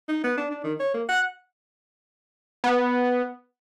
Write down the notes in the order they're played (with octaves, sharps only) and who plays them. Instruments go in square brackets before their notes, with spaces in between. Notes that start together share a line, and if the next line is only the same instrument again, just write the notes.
[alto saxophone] D#4
B3
D4
D4
D#3
C#5
A#3
F#5
[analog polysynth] B3